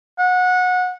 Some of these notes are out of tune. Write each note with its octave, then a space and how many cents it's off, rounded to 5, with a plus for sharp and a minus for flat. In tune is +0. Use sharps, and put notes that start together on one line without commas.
F#5 -20